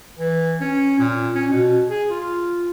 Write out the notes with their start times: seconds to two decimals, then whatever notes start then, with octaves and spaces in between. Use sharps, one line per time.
0.18 E3
0.61 C#4
0.99 A#2
1.35 C#4
1.51 B2
1.90 G#4
2.10 F4